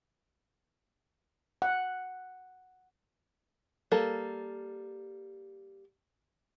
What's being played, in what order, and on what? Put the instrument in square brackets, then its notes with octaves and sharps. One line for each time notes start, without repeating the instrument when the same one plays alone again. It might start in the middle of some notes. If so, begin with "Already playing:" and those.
[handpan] F#5
[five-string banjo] G3 A#3 A4